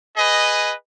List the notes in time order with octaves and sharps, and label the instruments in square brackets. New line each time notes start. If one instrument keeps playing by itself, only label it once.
[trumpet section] G#4 B4 D#5